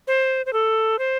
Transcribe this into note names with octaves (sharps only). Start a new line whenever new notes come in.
C5
C5
A4
C5